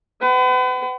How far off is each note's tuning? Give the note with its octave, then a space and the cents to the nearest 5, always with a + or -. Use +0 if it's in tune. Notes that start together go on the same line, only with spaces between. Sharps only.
B4 +40 F#5 +40